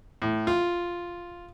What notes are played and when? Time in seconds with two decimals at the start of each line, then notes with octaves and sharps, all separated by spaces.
0.22 A2
0.47 F4